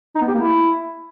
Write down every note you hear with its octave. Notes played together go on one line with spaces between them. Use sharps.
D#4
B3
G4
A#3
E4